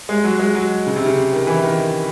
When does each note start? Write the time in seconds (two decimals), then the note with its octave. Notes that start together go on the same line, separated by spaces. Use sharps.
0.09 G#3
0.24 F#3
0.39 G#3
0.55 F#3
0.86 C#3
0.96 C3
1.06 C#3
1.32 D#3
1.47 E3
1.64 D#3